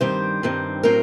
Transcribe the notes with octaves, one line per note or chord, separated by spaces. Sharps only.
G2 D#3 G3 C4 C5
G2 D#3 G3 C4
A2 F#3 C4 A#4